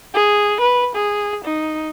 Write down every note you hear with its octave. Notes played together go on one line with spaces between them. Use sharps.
G#4
B4
G#4
D#4